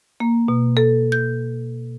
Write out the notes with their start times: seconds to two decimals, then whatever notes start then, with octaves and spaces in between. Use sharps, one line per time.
0.20 A#3
0.48 B2
0.77 A4
1.12 G6